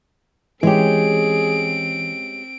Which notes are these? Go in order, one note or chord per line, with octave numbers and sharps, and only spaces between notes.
E3 G#3 C4 C#4 G4 G#4 D7